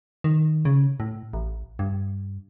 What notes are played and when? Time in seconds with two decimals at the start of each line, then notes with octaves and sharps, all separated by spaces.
0.24 D#3
0.65 C#3
1.00 A2
1.33 A1
1.79 G2